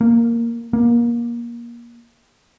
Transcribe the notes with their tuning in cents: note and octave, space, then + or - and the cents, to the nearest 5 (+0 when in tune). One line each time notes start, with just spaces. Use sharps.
A#3 -5
A#3 +25